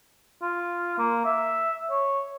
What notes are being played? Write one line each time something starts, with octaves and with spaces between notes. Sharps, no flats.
F4
A#3
E5
C#5